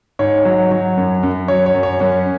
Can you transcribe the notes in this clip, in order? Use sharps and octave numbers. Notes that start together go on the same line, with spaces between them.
G#2 C#5
F#3
F#3
F#2
F#2
F#3 C#5
C#5
F#2
C#5
F#2 C#4